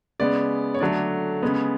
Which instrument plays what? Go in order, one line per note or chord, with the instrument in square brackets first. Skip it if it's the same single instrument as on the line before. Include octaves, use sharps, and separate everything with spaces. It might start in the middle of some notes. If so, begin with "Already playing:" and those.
[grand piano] C#3 G#3 B3 D5
C#5
D3 F#3 A3 D5
C#3 G#3 B3